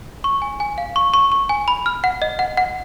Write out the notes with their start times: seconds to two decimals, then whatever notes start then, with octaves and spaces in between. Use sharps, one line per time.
0.24 C#6
0.42 G#5
0.60 G#5
0.78 F5
0.96 C#6
1.14 C#6
1.32 C#6
1.49 G#5
1.68 B5
1.86 F6
2.04 F#5
2.22 D#5
2.39 F#5
2.57 F#5